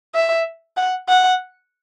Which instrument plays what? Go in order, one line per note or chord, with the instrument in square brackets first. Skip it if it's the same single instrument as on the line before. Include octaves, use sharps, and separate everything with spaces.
[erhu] E5
F#5
F#5